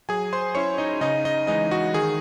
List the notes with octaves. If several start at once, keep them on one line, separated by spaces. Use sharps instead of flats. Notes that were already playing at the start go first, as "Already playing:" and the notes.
F#3 G#4 G#5
C5 C6
C#4 E4 C#5 C#6
D#4 D#5
C#3 D#4 D#5
D#4 D#5
E3 G#3 D#4 D#5
F#4
D#3 G#4